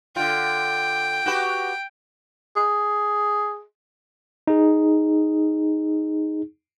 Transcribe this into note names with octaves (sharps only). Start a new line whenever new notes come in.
D3 F4 G5
F#4 G4 B4
G#4
D#4 G#4